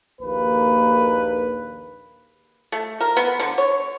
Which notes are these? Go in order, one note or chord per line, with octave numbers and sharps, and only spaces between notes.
A#1 D#2 A#3 B4
A3
A#4
B3
D3
C#5